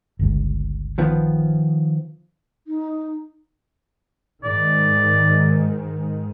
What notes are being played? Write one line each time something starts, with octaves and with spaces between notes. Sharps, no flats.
G1 C#2 G2
D#3 F3 B3
D#4
G#2 D#3 D5